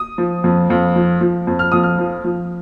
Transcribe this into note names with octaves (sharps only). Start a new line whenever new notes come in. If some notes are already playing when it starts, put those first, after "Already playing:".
Already playing: D#6
F3
F2
F2
F3
F3
F2
F6
F2 D#6
F6
F3
F3